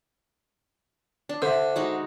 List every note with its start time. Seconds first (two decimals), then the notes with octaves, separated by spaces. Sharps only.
1.29 D4
1.42 D3 C5 E5
1.76 G#3 D#4 F#4